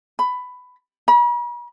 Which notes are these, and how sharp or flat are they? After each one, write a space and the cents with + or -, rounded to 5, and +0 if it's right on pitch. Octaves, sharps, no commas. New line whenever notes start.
B5 +15
B5 -45